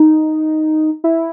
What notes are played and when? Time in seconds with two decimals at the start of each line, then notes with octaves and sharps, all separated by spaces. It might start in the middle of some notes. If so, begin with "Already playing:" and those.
Already playing: D#4
1.04 E4